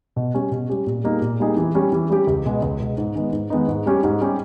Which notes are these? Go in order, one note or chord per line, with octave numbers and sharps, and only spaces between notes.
B2
G3 C#4 G4
B2
G3 C#4 G4
A#2
G3 A#3 D#4 G#4
A#2
G3 A#3 D#4 G#4
E3
G3 C#4 G4
E3
G3 C#4 G4
C#2
B2 G#3 B3
C#2
B2 G#3 B3
G#2
D#3 G#3 B3 D#4
G#2
D#3 G#3 B3 D#4
G#2
G3 C#4 G4
G#2
G3 C#4 G4